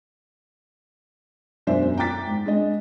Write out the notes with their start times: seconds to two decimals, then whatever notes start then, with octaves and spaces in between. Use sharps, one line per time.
1.67 E1 F#2 D4 C5 D5 E5
1.97 G5 A#5 D6 A6 B6
2.27 G#2
2.46 G#3 D4 D#5